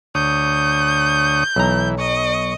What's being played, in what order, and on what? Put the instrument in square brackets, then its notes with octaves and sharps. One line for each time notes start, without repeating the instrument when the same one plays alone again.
[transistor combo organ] D2 C#5 D#6 [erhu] G6
[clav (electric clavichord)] B1 A#5 [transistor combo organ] E3
[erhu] D#5 [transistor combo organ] C#6